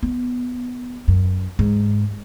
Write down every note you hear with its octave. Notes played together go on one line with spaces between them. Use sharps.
B3
F#2
G#2